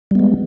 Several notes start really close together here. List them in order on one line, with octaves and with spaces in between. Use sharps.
G3 B3 G#3